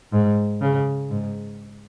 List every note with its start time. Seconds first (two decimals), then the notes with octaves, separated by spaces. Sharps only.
0.13 G#2
0.62 C#3
1.10 G#2